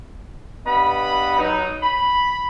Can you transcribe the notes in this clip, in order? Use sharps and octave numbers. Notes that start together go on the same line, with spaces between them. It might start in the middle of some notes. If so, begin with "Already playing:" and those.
G2 B3 D#5 F#5 B5
F#3 D#4
B5